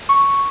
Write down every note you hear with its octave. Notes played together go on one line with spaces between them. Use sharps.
C#6